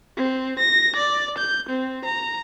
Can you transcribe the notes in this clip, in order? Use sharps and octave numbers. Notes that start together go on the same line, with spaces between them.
C4
A#6
D5
G6
C4
A#5